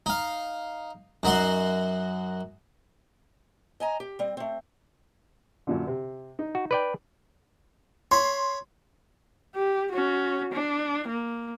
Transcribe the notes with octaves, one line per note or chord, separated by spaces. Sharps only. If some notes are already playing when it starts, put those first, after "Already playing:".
D#4 F5
F#2 D#4 F#4 C6
D#5 G#5 A#5
G4
G3 C4
A3 C4
F#2 A#2 D3
C3
D#4
F#4
B4 D5 G5
C#5 B5 C6
G4
C#4 F#4
D4
A#3